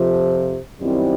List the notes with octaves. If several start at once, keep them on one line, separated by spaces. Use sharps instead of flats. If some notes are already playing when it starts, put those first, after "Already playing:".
Already playing: F2 C3 F3
F#2 D#3 G3 C4 E4